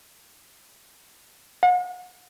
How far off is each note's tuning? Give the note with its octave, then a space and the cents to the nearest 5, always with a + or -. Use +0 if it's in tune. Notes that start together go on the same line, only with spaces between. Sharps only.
F#5 -40